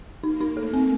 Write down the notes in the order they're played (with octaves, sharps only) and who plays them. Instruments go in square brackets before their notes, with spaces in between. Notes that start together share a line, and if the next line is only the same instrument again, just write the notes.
[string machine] A#3 [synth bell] D#4
[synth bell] D#4
[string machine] A3 [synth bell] A4
[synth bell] C4